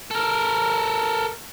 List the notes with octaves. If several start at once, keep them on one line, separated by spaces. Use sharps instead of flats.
A4 A#4